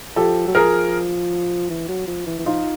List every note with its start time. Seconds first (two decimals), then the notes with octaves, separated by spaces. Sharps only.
0.16 F3 G4 A4
0.47 F#3
0.55 F3 G#4 A#4
1.70 E3
1.89 F#3
2.08 F3
2.27 E3
2.39 E3
2.46 F3 D#4 F4